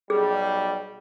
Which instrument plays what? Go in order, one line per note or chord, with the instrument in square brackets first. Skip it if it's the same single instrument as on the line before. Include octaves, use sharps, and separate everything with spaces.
[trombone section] B1 G3 [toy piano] G#4